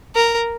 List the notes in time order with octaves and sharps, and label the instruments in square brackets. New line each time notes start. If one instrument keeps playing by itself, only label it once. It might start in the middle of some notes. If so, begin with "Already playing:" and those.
[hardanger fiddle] A#4